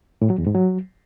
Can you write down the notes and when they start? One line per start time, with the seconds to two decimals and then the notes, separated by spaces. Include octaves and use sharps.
0.22 A2
0.30 F#3
0.38 E2
0.47 G#2
0.55 F#3